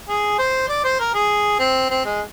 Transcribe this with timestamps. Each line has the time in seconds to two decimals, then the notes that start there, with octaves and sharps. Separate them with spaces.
0.09 G#4
0.38 C5
0.68 D5
0.84 C5
0.99 A#4
1.14 G#4
1.59 C4
1.90 C4
2.05 G#3